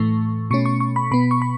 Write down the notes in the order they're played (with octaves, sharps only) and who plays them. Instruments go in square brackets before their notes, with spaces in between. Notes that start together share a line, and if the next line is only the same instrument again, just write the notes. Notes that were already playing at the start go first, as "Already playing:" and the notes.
Already playing: [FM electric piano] A2 E3 A3 C#6
B2 A3 C#4 C#6
C#6
C#6
B5
B2 B3 B5
C#6
B5